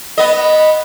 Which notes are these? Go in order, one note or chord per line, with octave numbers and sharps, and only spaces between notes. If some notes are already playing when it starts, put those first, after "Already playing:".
B3 D#5